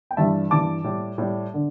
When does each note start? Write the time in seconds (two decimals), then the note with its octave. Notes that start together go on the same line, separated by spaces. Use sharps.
0.11 G5
0.17 G2 E3 G3 E5 A5
0.50 G2 E3 G3 A5 D6
0.84 A2 G3
1.18 A2 G3
1.54 D3